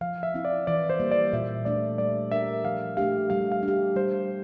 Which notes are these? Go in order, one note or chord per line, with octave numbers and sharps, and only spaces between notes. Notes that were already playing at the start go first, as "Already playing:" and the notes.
F3 F5
E5
C4 E4
D5
E3 D5
C5
G3 A#3
D5
A#2 E5
A3 D4 D5
G3 D5
D4 G4 A#4 E5
F3 F5
A3 D4 G4 F5
G3 F5
F5
D4
G4
G3 C5